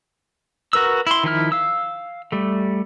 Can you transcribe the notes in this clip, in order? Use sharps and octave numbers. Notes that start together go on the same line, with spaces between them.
F#4 A#4 B4 E6
E4 C6
D#3 F3 E4 F6
F5 E6
G3 A3